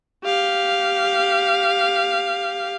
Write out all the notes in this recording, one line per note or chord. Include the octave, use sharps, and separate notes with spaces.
G4 F5